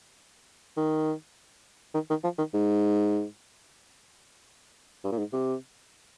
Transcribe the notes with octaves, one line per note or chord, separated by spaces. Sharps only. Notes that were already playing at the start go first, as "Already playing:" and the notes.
D#3
D#3
D#3
F3
D#3
G#2
G2
A#2
G#2
C3